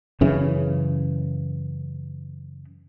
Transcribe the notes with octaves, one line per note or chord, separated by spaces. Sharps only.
F#2 C#3 E3